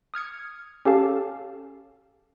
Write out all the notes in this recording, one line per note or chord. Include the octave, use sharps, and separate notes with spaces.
D#6 F6 G#6 C#7
C#4 G4 A4 F5 A5